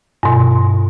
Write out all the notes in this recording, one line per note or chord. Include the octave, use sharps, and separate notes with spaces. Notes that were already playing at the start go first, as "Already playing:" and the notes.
G2 B2